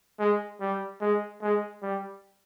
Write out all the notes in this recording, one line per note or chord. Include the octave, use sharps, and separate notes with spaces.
G#3
G3
G#3
G#3
G3